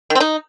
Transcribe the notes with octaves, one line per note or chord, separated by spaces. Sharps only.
D#3
C4
D#4